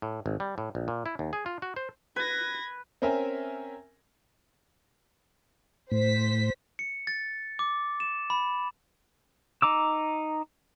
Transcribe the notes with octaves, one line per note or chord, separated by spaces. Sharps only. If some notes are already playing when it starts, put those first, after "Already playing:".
A2
G#1
G3
A2
A#1
A#2
E4
D#2
G#4
F4
F#4
C5
B4 G#6 A#6
C4 C#4 A#4 E5 G#5
A2 C5 B6
C#7
A6
D6
E7
B5
D#4 A#5 D6 E6